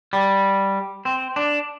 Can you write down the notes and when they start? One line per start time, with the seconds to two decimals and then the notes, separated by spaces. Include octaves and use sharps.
0.13 G3
1.05 C4
1.36 D4